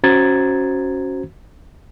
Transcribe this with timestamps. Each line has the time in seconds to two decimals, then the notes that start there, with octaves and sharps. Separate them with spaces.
0.04 C#4 F#4 C5 A#5 G#6 A6